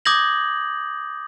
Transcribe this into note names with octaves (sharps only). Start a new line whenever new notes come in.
D6 D#6 G6 G#6 A#6 F#7